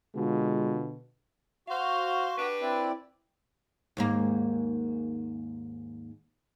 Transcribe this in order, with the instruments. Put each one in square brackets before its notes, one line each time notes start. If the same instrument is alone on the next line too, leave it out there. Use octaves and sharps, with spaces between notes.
[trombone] B2 [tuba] D3 [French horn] G#3 [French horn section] F4
[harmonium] F#4 [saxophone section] C5 F5
[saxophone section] D4 G4 B4
[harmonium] C4 E4 D5
[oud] D#2 G#2 A#3